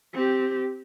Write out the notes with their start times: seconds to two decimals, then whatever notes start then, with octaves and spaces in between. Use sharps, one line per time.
0.13 C4 G4